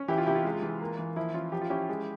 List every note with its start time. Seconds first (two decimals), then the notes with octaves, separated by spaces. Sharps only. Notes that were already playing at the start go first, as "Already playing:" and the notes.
Already playing: C#4
0.08 E3 E4 G4
0.18 F4
0.26 C3 E4 G4
0.35 F4
0.45 G#3
0.62 E3
0.81 A#3
0.99 E3
1.16 F3 E4
1.34 C#4 F4
1.52 F3 G4
1.61 F4
1.70 C#4 E4 G4
1.89 G#3